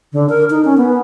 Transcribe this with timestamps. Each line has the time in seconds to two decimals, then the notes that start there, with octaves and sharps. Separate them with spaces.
0.13 D3
0.29 A#4
0.50 D#4
0.64 C#4
0.77 B3